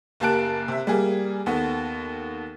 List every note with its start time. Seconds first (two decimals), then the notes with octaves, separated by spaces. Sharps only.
0.20 F#1 A#3 G4 A5 F#6 D7
0.68 C3 E5
0.87 G3 A#3 G#4
1.46 D#2 B3 A4